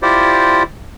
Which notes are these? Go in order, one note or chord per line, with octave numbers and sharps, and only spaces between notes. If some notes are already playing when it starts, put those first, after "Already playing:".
E4 F4 G4 C5 D5